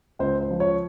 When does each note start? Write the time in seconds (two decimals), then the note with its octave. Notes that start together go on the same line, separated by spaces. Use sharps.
0.19 C#2 C5
0.40 C5
0.51 F3
0.60 C#5